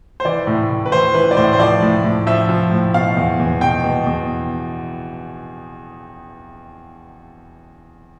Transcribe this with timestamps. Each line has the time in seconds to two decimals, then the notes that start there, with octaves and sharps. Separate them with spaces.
0.20 C5
0.25 E3 D5
0.47 A2
0.69 A2
0.86 B4
0.92 E3 C5
1.14 E3 B4
1.31 D5
1.37 A2 C5
1.53 C5
1.59 F3 D5
1.82 A2
2.04 A2
2.27 F3 E5
2.49 F3
2.72 A2
2.94 B2 F5
3.17 E2
3.39 E2
3.61 B2 G5
3.84 B2
4.07 E2